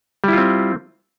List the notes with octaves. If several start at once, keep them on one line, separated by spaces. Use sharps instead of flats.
G3 C4 E4 F4